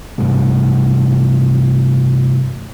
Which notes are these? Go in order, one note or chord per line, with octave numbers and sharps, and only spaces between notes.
G2 C3 G3 A3